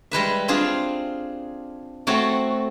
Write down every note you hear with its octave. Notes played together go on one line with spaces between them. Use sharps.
G3 G#3 B4 E5
C4 D4 F4 G#4 F5
A3 C4 F#4 A4 C#5